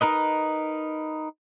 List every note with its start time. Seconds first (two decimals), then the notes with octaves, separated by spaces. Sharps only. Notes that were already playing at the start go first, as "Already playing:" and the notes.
0.01 D#4 A#4 B4 D#5